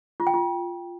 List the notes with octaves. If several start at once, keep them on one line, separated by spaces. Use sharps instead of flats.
F4
G5
F4